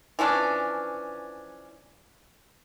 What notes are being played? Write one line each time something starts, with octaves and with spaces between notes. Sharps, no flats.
E3 F3 C#4 D4